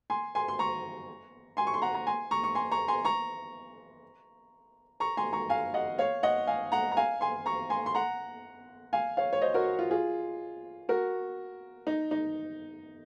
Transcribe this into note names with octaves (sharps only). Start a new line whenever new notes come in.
G#5 C6
G#5 C6
C6
A#5 C#6
G#5 C6
C#6
C6
F#5 A#5
A#5
G#5 C6
A#5 C#6
C#6
G#5 C6
A#5 C#6
G#5 C6
A#5 C#6
A#5 C#6
G#5 C6
A#5 C#6
F5 G#5
D#5 F#5
C#5 F5
D#5 F#5
F5 G#5
F#5 A#5
A#5
F5 G#5
G#5 C6
A#5 C#6
G#5 C6
C6
F#5 A#5
F5 G#5
C#5 F5
C#5
C5 D#5
F#4 A#4
F4
F4 G#4
F#4 A#4
D#4
D#4